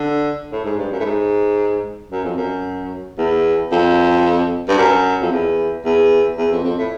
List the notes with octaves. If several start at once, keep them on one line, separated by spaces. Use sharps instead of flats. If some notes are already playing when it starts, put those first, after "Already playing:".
Already playing: D3
A2
G#2
G2
F#2
A2
G#2
F#2
F2
F#2
E2
F2
G2
F#2
F2
E2
E2
E2
F2
F2
A2